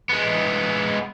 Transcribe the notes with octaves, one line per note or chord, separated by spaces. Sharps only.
G#3 B3